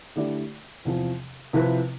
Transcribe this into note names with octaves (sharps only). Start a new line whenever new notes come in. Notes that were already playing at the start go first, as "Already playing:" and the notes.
D3 A3 E4 G4 D5
E2 C3 F3
C3 F3 C4 E4 B4